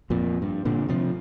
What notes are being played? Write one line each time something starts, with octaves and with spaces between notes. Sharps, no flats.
F2 A#2
G2
A#2 D3
C3 F3